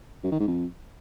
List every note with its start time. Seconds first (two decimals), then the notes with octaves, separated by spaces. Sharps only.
0.24 F#2
0.32 D#3
0.40 G#2
0.48 F2